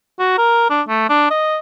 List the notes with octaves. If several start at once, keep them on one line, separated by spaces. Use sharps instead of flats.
F#4
A#4
D4
A3
D4
D#5